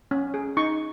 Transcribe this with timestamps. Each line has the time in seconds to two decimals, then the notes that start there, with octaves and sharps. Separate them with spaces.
0.11 C#4
0.34 G#4
0.57 D#4 C#6